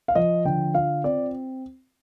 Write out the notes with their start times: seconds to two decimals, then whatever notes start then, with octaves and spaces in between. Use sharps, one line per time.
0.08 F5
0.15 F3 D#5
0.45 D3 G5
0.75 F4 F5
1.04 C4 D5